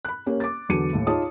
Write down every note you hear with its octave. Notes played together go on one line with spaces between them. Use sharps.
B5 F#6
A#3 C#4 G4 C#5
D6 A6
E2 D3 F#3 C#7 D#7
D#2 A2
D#4 F4 G#4 C#5 A5 D#6